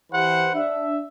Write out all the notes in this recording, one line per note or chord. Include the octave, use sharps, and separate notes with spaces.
E3 G4 B4 C5 F#5
D4 E5